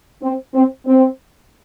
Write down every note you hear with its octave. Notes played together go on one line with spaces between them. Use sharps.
C4
C4
C4